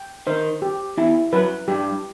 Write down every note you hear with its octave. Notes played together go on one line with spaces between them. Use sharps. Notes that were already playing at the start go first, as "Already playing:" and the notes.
Already playing: G5
D#3 C5
G4
E2 E3 E4
F#2 F#3 B4
G2 G3 G4